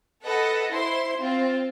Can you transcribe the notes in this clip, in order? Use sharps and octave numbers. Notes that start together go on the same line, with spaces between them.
A4 B4 D#5 F#5
E4 C5 C6
C4 F4